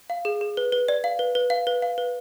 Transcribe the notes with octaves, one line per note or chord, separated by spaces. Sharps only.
F5
G#4
G#4
B4
B4
D5
F5
B4
B4
F5
B4
F5
B4